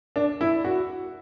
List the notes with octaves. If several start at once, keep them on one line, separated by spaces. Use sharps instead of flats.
D4
E4
F#4